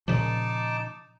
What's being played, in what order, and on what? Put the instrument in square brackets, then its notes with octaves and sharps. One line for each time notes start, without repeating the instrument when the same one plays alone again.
[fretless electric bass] A#2 C#3 F3 [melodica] D#4 A5 D6